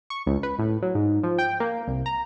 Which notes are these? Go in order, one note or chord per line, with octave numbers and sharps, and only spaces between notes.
C#6
C#2
B4
A2
F#3
G#2
F3
G5
A#3
C2
A#5